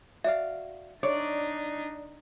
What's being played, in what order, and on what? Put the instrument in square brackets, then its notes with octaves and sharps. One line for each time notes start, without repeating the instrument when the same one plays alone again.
[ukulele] F#4 D5 F5 [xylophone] E5
[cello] D4 D#4 [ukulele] C#5 [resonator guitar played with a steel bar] D5